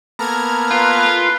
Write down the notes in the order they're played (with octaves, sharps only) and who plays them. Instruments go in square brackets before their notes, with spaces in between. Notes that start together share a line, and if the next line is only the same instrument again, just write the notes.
[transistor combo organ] A#3 B3 A4 [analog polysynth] A#5 F6 G#6
[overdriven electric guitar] F4 [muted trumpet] B4